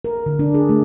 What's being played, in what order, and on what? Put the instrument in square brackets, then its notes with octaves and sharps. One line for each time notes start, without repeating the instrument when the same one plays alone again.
[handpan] A#4
D3
D4
G#4
A3